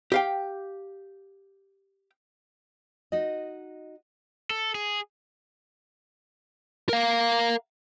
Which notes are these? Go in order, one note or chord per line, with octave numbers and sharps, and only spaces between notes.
G4 F5 G5
D#4 F#4 D#5
A4
G#4
A#4 F5